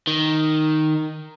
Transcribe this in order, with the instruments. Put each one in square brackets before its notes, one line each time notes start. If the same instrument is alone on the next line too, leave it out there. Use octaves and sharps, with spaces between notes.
[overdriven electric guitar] D#3